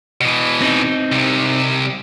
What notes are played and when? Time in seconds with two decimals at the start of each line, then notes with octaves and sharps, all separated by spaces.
0.21 B2 E3
0.62 C4 D#4
1.12 C2 C3